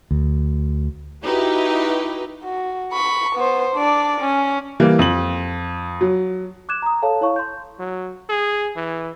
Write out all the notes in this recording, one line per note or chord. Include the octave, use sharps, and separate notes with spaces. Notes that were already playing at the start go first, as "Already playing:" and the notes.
D2
D#4 E4 F#4 G4 B4
F#4
B5 C#6
B3 C5
D4 D5
C#4
E3 G3 A#3
F2 F#7
F#3
D6 F#6 G#6 E7
A#5 D#6
A4 C#5 F5 A5
E4 C#5 F5 C#6
C6 G6
F#3
G#4
E3